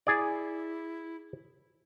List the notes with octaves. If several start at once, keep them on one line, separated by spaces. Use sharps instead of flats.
E4 G#4 D5